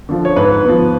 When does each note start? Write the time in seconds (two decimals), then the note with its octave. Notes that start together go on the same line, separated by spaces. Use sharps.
0.09 D3 F3
0.25 C#5
0.36 G#2 B4
0.64 F3 B3